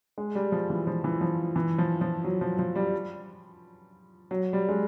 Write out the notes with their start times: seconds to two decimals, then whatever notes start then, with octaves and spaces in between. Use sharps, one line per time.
0.18 G#3
0.35 G3
0.52 F3
0.70 E3
0.87 F3
1.04 E3
1.21 F3
1.56 E3
1.78 F3
2.01 F3
2.24 F#3
2.41 F3
2.59 F3
2.75 G3
4.31 F#3
4.53 G3
4.69 G#3